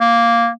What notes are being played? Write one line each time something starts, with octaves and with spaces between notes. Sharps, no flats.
A#3